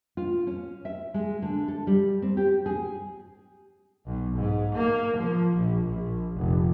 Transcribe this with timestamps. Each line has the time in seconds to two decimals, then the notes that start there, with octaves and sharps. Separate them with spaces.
0.17 F4
0.47 C#4
0.85 E5
1.14 G#3
1.42 D3
1.68 A4
1.87 G3
2.22 C4
2.37 G4
2.66 G#4
4.06 B1
4.38 G#2
4.76 A#3
5.18 F3
5.57 A#1
5.89 A#1
6.37 F1